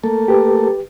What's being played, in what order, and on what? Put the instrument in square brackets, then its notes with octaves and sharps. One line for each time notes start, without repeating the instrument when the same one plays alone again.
[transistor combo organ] A3 A#3 A4
[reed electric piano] G4 B4